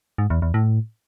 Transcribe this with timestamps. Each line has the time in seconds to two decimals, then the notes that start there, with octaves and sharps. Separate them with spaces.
0.18 G#2
0.30 E2
0.42 E2
0.54 A2